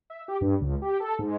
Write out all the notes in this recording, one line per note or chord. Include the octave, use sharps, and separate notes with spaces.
E5
G4
G2
C#2
G4
A4
G#2